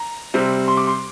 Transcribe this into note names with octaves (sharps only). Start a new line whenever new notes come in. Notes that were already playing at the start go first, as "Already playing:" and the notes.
Already playing: A#5
C3 G3 C4
C6
D6
C6